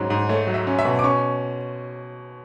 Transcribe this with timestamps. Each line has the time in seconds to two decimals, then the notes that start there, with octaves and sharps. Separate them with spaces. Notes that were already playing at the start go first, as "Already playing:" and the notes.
Already playing: G#2 F#3 C#4
0.10 G#2
0.29 A3 C#5
0.47 F#3
0.54 E5
0.67 C#4
0.79 E5
0.85 B2
0.99 D6
1.04 C#4 C#6